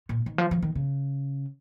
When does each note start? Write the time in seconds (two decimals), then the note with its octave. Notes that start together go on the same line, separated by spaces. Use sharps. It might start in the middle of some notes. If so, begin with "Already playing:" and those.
0.09 A#2
0.26 D#3
0.38 F3
0.51 F3
0.62 D#3
0.75 C#3